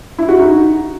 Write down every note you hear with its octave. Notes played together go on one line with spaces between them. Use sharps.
E4
F#4
D#4